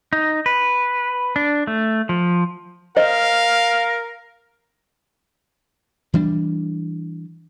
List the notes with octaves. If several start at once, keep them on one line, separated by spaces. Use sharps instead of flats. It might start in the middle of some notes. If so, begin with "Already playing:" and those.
D#4
B4
D4
A3
F3
A#4 C5 D#5 F5
E3 G3 D4